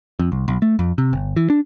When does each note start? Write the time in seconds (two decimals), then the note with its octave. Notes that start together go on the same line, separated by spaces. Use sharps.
0.19 F2
0.32 C2
0.48 B1
0.62 A3
0.79 F2
0.98 C3
1.13 G1
1.36 E3
1.50 D4